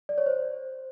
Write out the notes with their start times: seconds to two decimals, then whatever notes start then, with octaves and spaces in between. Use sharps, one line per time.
0.09 D5
0.18 C#5
0.26 C5